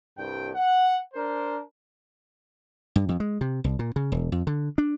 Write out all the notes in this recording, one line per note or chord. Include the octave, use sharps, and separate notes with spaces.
C2 G2 G5
F#5
D4 A#4 C5
G2
F2
G#3
C3
C2
A#2
C#3
E1
F2
D3
D4